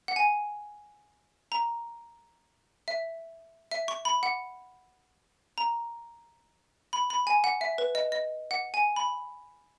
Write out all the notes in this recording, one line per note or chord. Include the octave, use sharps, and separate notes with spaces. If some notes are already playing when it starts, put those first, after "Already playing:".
F#5
G#5
A#5
E5
E5
C#6
B5
F#5
A#5
B5
B5
G#5
F#5
E5
B4
D#5
D#5
F#5
G#5
B5